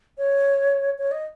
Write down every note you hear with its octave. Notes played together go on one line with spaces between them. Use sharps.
C#5
C#5
D#5